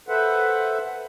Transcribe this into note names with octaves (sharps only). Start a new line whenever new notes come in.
A4 B4 C5 E5 F#5